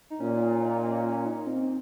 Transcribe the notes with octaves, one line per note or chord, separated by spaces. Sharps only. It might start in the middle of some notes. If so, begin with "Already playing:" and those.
D#4
A#2 C#4
C#4
D#4
D#4
C#4
C#4
D#4
C4